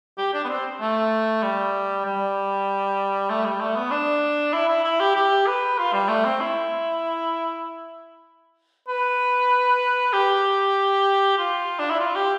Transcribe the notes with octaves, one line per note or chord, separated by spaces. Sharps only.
G4
D4
B3
C4
A3
G3
G3
A3
G3
A3
B3
D4
E4
E4
E4
G4
G4
B4
F4
G3
A3
C4
E4
B4
G4
F4
D4
E4
F4
G4